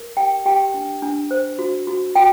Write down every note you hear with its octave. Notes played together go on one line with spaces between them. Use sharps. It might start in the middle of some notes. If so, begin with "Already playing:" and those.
Already playing: A#4
G4 G5
G4 G5
D4
D4
C5
F#4
F#4
F#4 G5